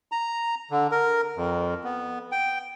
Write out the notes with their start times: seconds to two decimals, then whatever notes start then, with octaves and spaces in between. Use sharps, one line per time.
0.12 A#5
0.71 D3
0.91 A#4
1.37 F2
1.84 B3
2.32 G5